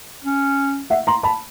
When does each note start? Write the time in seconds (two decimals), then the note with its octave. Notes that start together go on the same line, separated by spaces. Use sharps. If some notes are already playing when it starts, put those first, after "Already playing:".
0.24 C#4
0.90 E5 F#5
1.07 A#5 C6
1.23 A5 B5